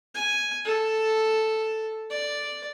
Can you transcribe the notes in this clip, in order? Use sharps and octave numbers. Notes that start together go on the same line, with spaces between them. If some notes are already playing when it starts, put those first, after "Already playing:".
G#5
A4
D5